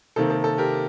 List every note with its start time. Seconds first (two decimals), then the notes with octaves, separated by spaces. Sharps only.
0.16 C3 D#3 A#3 A4
0.30 A4
0.44 A4
0.58 G4 A#4